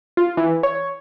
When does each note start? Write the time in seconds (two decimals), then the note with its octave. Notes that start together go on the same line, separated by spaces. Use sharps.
0.17 F4
0.37 E3
0.63 C#5